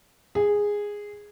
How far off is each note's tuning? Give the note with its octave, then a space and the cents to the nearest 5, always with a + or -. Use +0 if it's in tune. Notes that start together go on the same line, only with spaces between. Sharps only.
G#4 -10